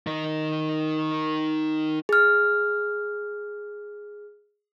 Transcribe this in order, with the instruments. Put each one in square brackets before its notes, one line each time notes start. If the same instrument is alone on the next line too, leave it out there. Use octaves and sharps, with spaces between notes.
[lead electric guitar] D#3 D#4
[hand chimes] G#4 F6